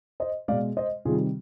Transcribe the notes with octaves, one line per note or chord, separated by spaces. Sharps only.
C5 D#5
B2 G#3 D5 F5
C5 D#5
C3 D#3 G3 F4 G#4